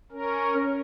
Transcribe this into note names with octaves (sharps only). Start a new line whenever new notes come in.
C#4 A#4